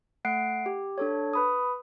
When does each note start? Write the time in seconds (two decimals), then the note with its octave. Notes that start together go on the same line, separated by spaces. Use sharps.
0.25 A3 F#5 F#6 C7 D7
0.66 G4
0.98 D4 A4 C#5
1.33 B4 B5 D#6